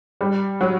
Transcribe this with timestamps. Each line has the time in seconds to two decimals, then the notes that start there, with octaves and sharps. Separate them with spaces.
0.21 G3
0.61 F#3